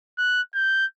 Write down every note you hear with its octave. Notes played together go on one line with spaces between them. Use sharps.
F#6
G6